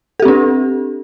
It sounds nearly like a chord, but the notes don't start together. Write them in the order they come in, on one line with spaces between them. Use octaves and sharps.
A4 G4 C4 D4